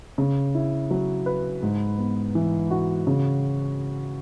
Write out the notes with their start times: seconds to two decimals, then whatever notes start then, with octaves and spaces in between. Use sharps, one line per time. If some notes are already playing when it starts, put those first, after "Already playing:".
0.18 C#3
0.55 E4
0.91 F#3
1.26 B4
1.63 G#2
1.99 B3
2.35 E3
2.71 F#4
3.07 C#3